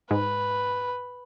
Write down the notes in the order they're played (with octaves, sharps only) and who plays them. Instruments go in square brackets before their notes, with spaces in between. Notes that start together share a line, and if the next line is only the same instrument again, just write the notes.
[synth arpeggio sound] G#2 [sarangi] B4